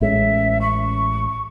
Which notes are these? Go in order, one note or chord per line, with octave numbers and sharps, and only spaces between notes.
A1 G#3 C#4 E5
C#6